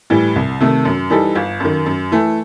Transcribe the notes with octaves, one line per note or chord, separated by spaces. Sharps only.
A2 E3 G3
C2
C3 D#3 A3
F#2
E3 G3 D#4 A4
G1
F#2 D#3
F#2
E3 A3